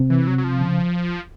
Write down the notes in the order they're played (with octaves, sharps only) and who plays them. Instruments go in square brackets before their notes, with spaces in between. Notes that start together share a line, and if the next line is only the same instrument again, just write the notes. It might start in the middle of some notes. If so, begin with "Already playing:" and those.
Already playing: [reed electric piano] C3 C4
[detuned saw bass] E3
F#3
F#3
F3
[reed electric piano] C#3